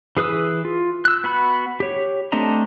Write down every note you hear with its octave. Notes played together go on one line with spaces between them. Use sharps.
E3 G#4 B4 D#6 E6
F4
E6 F#6
B3 F#4 B5
G4 C#5
A3 C4 D4 D#5 A#5